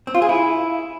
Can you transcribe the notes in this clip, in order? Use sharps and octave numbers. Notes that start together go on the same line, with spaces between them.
C4
F4
G#4
E4